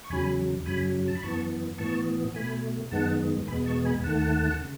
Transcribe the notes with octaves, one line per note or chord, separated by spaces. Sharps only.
C#6
E2 C#3 F#3 G#5 B5
F#2 C#3 F#3 G#5 B5
A5
B5
F#2 E3 B3 A5 C#6
A2 E3 B3 A5 C#6
B2 A3 G#5 B5
F#2 D#3 G#3 B3 F#5 A5
E2 B2 G#3 B3 G#5 B5
A5 C#6
G#5 B5
D#2 D#3 A3 F#5 A5
C#3